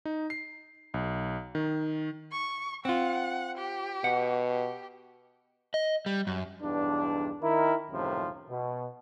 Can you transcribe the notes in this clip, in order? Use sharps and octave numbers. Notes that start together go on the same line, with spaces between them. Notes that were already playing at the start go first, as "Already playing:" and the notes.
D#4
C7
B1
D#3
C#6
C4 F4 F#5
G4
B2 F#5
G4
D#5
G3
F#2
B1 E2 G2 D4
D#3 E4 A#4
C#2 F#2 A2 C3 D#3 F3
B2